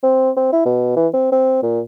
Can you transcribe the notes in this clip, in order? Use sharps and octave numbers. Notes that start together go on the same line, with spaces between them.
C4
C4
E4
B2
E3
C4
C4
A#2